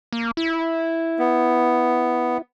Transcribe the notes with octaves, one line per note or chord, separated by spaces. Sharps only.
A#3
E4
B3